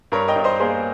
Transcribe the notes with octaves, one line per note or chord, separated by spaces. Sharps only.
G2 A#4 C#5
D#5 G5
G2
C5 D#5
A#3 G#4 C5